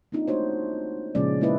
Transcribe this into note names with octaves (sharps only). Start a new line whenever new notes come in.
A#3 C4 D4 D#4 F4
G#3 A3 D4 F#4 C5 C#5
A#2 C#3 F3 G#3 C#4 D5
G#3 A#3 D#4 E4 B4 D#5